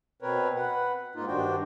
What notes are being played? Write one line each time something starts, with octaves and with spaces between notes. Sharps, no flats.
B2 C4 A#4 B4 C#5
B4 F#5
G#2 A#3 D#4 F4
G2 D#3 D4 F#4 C5 G5